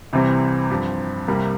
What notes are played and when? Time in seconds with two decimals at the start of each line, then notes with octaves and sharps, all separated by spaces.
0.13 C2 C3 E3 G3 C4
0.71 G2 F3 C4 G4
1.28 C2 C3 G3 A#3